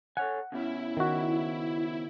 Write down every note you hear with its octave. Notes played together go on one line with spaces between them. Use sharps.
A4 C#5 F#5 G#5
C#3 B3 C#4 E4
D#3 F#4